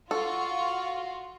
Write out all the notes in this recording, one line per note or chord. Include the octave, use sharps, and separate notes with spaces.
F4 F#4 A4 C#6